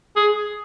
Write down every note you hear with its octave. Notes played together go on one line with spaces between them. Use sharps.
G#4